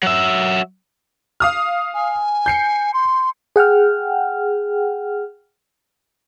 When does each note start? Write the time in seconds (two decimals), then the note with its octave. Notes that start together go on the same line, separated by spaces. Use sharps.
0.03 F#3 E5
1.40 F5 D#6 F6
1.94 G#5
2.46 G6 C7 C#7
2.94 C6
3.56 G#4 F#5 G5 F6